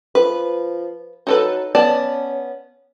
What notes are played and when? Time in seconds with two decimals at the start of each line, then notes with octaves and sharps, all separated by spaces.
0.15 F3 B4
1.27 F#3 D#4 A4 B4
1.75 B3 C#4 D5 A5